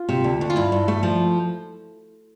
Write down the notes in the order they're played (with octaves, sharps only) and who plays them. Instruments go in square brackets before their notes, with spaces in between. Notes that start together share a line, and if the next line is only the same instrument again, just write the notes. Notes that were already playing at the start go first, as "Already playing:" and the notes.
Already playing: [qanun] F4
[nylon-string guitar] C3
D2
D2
[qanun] F4
[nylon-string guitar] G2 [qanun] E4
[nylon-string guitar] G2
A3
F3